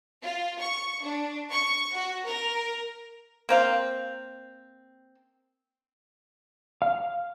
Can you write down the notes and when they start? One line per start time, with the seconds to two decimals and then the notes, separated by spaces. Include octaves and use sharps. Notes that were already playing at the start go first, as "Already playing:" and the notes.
0.22 F4
0.61 C#6
1.03 D4
1.52 C#6
1.95 F#4
2.26 A#4
3.49 A#3 C4 F5
6.82 F5